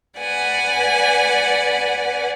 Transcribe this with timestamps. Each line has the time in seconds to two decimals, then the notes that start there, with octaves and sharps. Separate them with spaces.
0.18 B4 D5 F#5 G#5